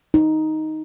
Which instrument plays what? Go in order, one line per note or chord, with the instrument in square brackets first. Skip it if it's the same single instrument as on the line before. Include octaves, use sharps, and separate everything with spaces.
[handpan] D#4